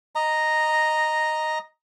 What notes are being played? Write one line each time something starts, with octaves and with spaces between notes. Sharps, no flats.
D#5 A#5